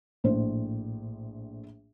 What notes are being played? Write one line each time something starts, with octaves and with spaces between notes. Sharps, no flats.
A#1 A2 C5